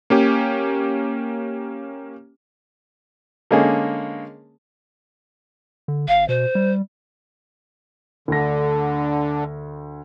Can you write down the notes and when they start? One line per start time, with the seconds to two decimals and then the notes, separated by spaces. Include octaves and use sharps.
0.10 A#3 C#4 G4
3.51 D3 G#3 A#3 C#4 G#4
5.88 D3
6.08 G#1 F5
6.29 B2 C5
6.55 G3
8.28 D2 D3 A#6